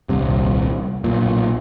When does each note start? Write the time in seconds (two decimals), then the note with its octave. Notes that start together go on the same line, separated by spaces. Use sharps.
0.09 D#1 C2 C3
1.04 B1 A#2